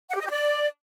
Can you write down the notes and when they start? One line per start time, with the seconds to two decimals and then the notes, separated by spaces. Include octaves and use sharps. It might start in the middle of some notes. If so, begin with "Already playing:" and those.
0.10 F#5
0.15 G4
0.20 D#5
0.25 G4
0.30 D5